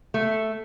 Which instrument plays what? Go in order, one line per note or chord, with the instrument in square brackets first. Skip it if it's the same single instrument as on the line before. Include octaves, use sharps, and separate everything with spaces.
[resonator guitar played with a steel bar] A3